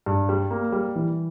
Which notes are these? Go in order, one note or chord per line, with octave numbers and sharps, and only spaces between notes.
G2
G3
A#3
G3
E3